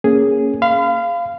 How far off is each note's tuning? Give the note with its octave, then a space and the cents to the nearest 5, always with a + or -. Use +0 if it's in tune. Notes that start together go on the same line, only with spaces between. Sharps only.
A#3 +0 C#4 +0 G#4 +0
F5 -15 B5 +40